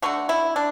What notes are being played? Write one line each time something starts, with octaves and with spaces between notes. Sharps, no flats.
D3 F#3 A3 F#4
E4
D4